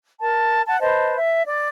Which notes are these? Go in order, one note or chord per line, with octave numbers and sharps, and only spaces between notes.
A#4 A5
F#5 A5
B4 C5 D#5 A5
E5
D5